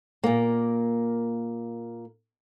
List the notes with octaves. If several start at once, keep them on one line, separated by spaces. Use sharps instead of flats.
A#2 A#3